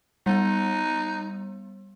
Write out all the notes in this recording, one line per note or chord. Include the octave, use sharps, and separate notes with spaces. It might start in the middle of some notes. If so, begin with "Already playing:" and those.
G3 B3 D#4